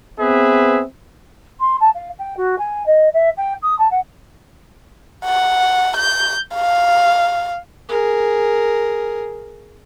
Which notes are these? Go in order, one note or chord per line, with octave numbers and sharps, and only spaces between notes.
B3 C4 G#4 B4 E5
C6
A5
F5
G5
F#4
G#5
D#5
E5
G5
D#6
A5
F#5
F#5
G6
F5
G#4 A#4